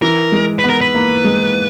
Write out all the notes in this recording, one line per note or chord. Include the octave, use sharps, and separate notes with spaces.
E3 A#4
G#3
B3 B4
A#4
B4
A#3
G#3